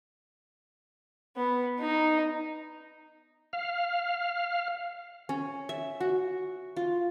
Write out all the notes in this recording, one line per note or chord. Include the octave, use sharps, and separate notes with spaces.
B3
D#4
F5
C#4
E5
F#4
F4